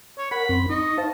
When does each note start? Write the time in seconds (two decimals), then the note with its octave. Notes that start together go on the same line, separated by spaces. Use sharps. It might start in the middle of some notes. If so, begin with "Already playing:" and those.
0.18 C#5
0.31 A#4 F#5 B5
0.49 F#2 C4 C6
0.70 D#4 D#5 C#6
0.98 C5 F5 A5